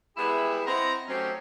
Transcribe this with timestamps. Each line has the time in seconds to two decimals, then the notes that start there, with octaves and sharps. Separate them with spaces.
0.16 G3 G#3 B3 E4 G4 E5
0.66 C4 E4 C5 D#5 F#5 A#5
1.07 F#3 A3 C4 C#4 D#4 G4